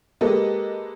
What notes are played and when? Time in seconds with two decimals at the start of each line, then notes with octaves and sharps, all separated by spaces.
0.21 G#3 A#3 G4 A4 B4 D#5